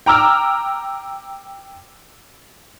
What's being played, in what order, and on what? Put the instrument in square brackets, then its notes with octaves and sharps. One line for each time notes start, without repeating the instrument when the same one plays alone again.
[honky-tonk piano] G5 A#5 D6 E6 F6